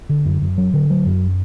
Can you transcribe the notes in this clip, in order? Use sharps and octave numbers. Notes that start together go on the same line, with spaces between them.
D3
F#2
F#2
F#3
D3
F#3
F#2